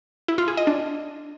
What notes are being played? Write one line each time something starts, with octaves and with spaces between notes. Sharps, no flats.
E4
F4
G#4
D#5
D4